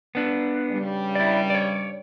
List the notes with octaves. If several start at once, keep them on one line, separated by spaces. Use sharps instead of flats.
B3 D4
G2 C#3 G3
E4 D5
C#5 D5